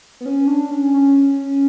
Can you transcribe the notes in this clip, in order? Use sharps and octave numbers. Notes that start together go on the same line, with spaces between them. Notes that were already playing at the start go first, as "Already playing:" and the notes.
B3
C#4
D4
C#4
C#4